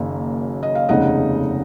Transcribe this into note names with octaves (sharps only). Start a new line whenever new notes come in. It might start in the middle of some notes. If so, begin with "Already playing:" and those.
Already playing: F#1 F#2 D#3 A#3 D#4
D#5
F5
F1 D#2 C#3 G#3 D#4 D#5 F#5